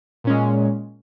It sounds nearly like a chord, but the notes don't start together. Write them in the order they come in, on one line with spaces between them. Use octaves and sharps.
A#2 C#4 G#3